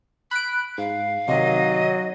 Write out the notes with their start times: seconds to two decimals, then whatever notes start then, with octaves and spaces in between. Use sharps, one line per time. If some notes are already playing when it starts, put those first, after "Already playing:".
0.31 B5 F#6 D7
0.78 G#2 F5
1.28 C3 D#3 F#3 D#5